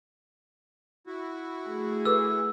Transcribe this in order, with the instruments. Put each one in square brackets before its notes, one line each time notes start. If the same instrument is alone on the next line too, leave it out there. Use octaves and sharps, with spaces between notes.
[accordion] E4 F#4
[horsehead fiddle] A3 G#4
[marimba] A4 B4 D6 [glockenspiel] E6